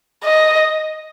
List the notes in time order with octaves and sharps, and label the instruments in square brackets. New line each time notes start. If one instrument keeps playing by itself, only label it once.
[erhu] D#5